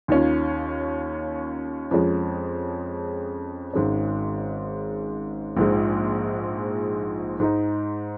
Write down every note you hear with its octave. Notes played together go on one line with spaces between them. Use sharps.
D#2 D#3 C#4 F4
F2 F3 G#3 C#4
G#1 G#2 G#3 C#4
A#1 G#2 F3 G#3
G#2 G#3 D#4